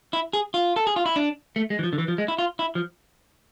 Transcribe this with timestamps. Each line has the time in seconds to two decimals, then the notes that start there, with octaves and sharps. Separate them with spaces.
0.13 E4
0.33 G#4
0.54 F4
0.76 A4
0.87 G#4
0.96 F4
1.06 E4
1.16 D4
1.56 A3
1.70 G#3
1.79 E3
1.83 F3
1.93 D3
1.98 E3
2.08 F3
2.18 G#3
2.28 E4
2.38 F4
2.59 E4
2.75 F3